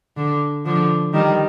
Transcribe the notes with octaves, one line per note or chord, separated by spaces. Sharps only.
D3
D3 F3
D#3 G3